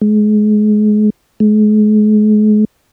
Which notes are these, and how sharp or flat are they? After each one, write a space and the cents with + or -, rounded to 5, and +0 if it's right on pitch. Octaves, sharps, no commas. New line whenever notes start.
G#3 +30
G#3 +40